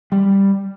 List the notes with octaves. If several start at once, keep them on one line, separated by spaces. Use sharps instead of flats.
G3